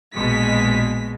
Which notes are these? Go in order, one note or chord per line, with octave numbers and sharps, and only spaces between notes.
A#1 B2 G#3 B6